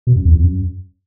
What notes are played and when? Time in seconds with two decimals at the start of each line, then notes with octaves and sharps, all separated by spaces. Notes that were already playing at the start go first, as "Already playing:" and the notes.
0.07 B2
0.16 F#2
0.25 E2
0.35 F2
0.44 F#2